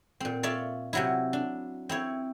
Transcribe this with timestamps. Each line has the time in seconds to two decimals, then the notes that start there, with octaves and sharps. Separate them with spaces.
0.20 A#2 C4
0.43 F4 C#5 D5 E5
0.93 C3 F#3 E4
1.33 D4
1.89 C4 E4 C#5